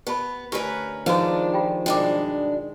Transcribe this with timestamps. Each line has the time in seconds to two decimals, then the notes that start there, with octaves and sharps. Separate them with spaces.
0.07 B3 G4 A5 B5
0.52 D2 C#4 G4 A#4 B4
1.06 D#3 F3 G#3 D4 F#4 B4 D5
1.54 F4 G4 G5
1.86 G2 B2 G#3 D4 G5 D6